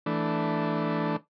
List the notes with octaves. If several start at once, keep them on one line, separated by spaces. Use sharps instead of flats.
E3 A3 D4